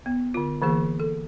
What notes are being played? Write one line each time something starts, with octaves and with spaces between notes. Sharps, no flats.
B3
D3 F4
D3 E3 A#3 G#4
A4